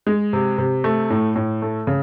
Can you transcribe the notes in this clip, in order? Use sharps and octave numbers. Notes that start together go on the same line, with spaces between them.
G#3
C3
C3
A3
A2
A2
A3
C#3